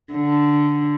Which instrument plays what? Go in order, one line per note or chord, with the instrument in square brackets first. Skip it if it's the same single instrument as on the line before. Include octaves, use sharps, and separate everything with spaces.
[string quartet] D3